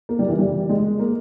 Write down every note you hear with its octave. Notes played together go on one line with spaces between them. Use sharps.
A#3
G3
E3
G3
G#3
A#3